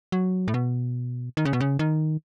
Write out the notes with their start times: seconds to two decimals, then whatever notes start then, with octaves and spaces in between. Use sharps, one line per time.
0.12 F#3
0.48 A2
0.54 B2
1.37 D#3
1.45 C#3
1.53 B2
1.60 C#3
1.79 D#3